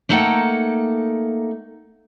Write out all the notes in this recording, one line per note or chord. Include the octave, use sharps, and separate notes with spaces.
A3 A#3 D#4 A4 F#5 G5